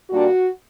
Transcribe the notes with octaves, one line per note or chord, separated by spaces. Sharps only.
A#2 G3 A#3 D4 F#4